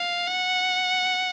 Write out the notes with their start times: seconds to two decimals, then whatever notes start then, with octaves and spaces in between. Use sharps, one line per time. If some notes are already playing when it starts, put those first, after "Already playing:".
Already playing: F5
0.28 F#5